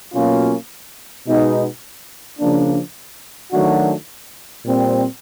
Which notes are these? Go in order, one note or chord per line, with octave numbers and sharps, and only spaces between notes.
B2 F#3 A#3 C#4 F4
B2 G#3 B3 D#4
C#3 F3 A#3 D4
D#3 F#3 A3 D4 F#4
A#2 G3 C4